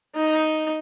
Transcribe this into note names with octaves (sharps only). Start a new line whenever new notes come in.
D#4